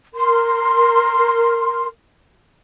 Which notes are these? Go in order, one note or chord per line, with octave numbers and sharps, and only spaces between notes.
A#4 C6